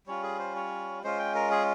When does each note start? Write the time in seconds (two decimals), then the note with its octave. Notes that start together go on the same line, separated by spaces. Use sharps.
0.07 G3 C#4 F4 C#5
0.23 G#4
0.39 C5
0.56 C#5
1.03 G#3 C#4 F4 C5
1.19 G5
1.35 A#4
1.51 G#4